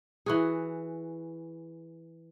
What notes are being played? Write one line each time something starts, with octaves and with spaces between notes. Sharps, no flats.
E3 F#4 G#4